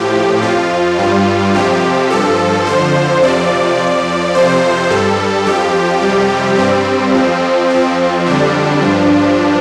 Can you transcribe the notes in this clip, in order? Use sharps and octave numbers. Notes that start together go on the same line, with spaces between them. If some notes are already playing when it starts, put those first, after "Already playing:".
Already playing: A2 F3 G4
F2 F3 F4
G2 G3
F2 C3 F3 G4
G2 F3 A4
F2 D3 F3 C5
F2 C3 F3 D5
F2 F3
F2 C3 F3 C5
G2 G3 A4
F2 F3 G4
F2 C3 G3
G2 G3 C4
F2 F3
F2 F3 C4
F2 D3 G3 D4
G2 F3